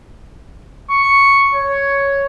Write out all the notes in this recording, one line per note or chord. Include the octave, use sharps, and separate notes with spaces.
C#6
C#5